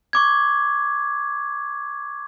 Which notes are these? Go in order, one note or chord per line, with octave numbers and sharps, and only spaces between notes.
C#6 D6 G#6